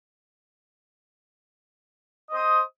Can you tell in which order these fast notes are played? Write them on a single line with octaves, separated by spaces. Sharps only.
D#5 C5 D#6